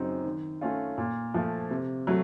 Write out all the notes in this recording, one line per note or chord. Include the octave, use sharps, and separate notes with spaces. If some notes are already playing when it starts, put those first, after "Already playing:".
Already playing: F#2 C#3 F#3 C4 D#4
D#3
A3 C#4 F4
A#2
F3 A3
C3
F#3 A3